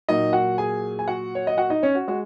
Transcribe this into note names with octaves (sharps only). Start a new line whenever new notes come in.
A#2 F#3 A#3 D#4 D#5
F#4 F#5
G#4 G#5
G#5
F#4 F#5
C#5
D#5
F#4 F#5
D#4 D#5
C#4 C#5
F#4
G#3 F#4